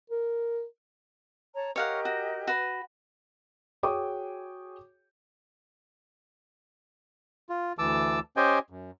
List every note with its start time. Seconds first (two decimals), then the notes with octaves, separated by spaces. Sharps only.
0.10 A#4
1.55 C#5 A5 A#5
1.76 G4 A#4 C#5 D#5 F5 F#5
2.05 F#4
2.47 F#4 B4
3.83 F#4 G#4 C#5 G5 D6 D#6
7.49 F4
7.79 D2 E3 A5 D6 E6
8.37 C#4 G4 C5 D#5 G5 G#5
8.70 F#2